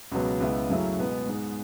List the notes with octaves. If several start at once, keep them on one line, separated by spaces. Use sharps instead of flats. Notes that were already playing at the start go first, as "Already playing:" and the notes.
C#2 B2 F#3 B3
C#2 C#3 G#3 B3 E4
F#2 C#3 F#3 A3 E4
B2 G#3 B3
G#2 G#3 B3